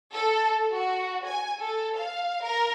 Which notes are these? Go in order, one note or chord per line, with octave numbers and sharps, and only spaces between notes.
A4
F#4
G#5
A4
F5
A#4